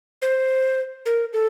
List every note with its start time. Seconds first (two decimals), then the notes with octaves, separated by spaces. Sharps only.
0.22 C5
1.06 A#4
1.33 A4